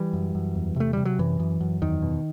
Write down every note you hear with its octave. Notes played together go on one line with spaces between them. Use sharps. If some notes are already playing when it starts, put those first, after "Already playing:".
Already playing: E3 G3
F#2
F#2
E2
C3 A3
C3 G3
F#3
F#2 E3
F#2
F#2
E2 D#3
B2